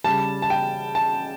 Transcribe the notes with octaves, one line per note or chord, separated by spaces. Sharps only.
C#3 G3 A5
A5
G5
A5